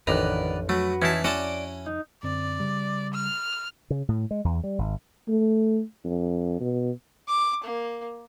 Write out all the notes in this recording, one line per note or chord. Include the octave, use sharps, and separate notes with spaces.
A1 F2 D#3 D4 B4 D5 F#5 A#5
F#3 A3 F#4 B4
E3 C#4 D#4 E4 A5
C#4 E4 F#4 C#5 D5 A5
D#4
F#2 D3 C4 D5
C#3 G3
F6
C#3
A2
G#3
E2
G3
G#1
A3
F2
B2
D6
A#3